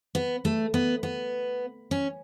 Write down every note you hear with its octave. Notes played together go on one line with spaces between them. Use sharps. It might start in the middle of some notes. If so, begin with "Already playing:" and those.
B3
A3
B3
B3
C#4